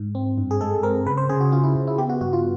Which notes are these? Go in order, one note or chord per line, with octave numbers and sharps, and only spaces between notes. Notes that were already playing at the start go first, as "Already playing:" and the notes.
Already playing: G#2
C4
G2
G#4
G#3 A4
C4 A#4
C#3 B4
C5
C#3 G#4
F#4
C#4 F4
E4
C#3
E4
B3 G4
F#4
G2 F#4
F4